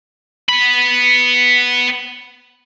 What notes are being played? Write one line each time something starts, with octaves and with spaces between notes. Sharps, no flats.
B3 B5